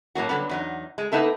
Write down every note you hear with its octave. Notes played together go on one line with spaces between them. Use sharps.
A2 F#3 A#3 F#4
D3 F#3 G3 B3
E2 F#3 D#4
G#3
A#3 B3 D#4 E4 A4